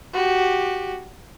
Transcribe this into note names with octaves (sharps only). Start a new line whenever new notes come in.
F#4 G4